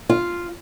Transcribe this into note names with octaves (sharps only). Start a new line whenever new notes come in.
F4